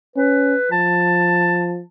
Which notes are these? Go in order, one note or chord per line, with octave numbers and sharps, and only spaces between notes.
C#4 B4
F3 A5